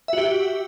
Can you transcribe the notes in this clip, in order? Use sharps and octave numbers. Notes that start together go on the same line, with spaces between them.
F#4 G4 E5